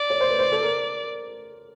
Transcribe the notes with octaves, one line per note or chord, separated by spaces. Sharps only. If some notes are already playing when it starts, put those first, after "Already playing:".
Already playing: D5
C#5
C5
B4
C5
A4
A#4